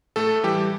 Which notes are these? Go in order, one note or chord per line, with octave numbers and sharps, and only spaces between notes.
A2 A3 A4
E3 G3 G4